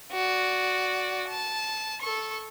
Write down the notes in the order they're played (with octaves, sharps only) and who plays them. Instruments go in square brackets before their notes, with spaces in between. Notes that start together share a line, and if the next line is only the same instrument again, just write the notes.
[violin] F#4 D5
A5
A4 C#6